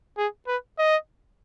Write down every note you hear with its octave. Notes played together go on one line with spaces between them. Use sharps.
G#4
B4
D#5